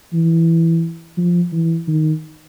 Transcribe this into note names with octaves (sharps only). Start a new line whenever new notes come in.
E3
F3
E3
D#3